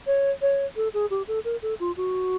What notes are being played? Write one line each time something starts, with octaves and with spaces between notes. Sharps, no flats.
C#5
C#5
A4
G#4
G4
A4
A#4
A4
F4
F#4